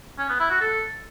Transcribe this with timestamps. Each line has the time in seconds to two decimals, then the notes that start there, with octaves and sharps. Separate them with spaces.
0.18 C#4
0.29 B3
0.40 E4
0.50 F#4
0.61 A4